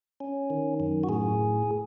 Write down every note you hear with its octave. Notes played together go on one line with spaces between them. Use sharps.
C#4
D#3
F#2
F#4
A2 G#4